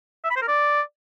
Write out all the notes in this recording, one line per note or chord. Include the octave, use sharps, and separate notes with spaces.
E5
B5
C5
A#4
D5